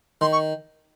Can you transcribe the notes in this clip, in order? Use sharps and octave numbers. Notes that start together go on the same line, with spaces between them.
D#3 C6
C#6